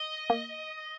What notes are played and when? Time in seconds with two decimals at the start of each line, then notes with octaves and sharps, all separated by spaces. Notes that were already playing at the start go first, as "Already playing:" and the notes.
Already playing: D#5
0.30 A#3